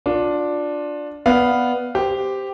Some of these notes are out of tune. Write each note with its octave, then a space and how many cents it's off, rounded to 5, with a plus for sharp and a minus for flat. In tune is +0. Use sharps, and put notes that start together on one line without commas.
D4 +0 F4 +25
B3 +0 D5 +0 F5 +0
G4 +0 C5 -15